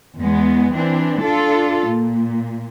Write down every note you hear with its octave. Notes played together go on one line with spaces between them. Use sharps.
E2 G#3 B3
E3 C4 D4
D4 F4 A4
A#2